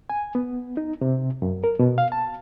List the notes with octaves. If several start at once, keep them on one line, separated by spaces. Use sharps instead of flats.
G#5
B3
D#4
C3
F#2
A#4
B2
F5
A5